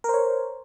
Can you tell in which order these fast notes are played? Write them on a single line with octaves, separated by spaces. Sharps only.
A#4 C5 C#5